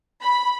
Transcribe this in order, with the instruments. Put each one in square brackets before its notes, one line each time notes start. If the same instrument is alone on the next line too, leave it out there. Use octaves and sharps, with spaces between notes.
[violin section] B5